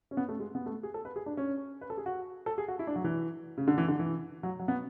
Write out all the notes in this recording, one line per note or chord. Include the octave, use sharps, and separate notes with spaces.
C#4
B3
A3
G#3
B3
A3
G#4
A4
B4
G#4
D4
C#4
B4
A4
G#4
F#4
A4
G#4
F#4
E4
D4
F#3
E3
C#3
D3
E3
D3
E3
F#3
F#3
B3